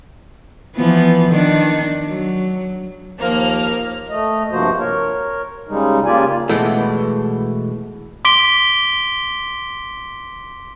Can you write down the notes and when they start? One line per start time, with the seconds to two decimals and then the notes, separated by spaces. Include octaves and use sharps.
0.76 E3 F3 B3
1.29 D#3 D4
2.08 F#3
3.19 D#2 F3 A#3 F6
4.09 A3 D#5
4.51 G2 C3 F3 A#3 F#4 C5
4.79 A#4 C#5
5.68 C#3 G3 G#3 D#4
6.05 C#3 A#3 F4 G4 D5 G#5
6.49 B2 E3 G#3 A3
8.25 C6 D6 B6 D7 G7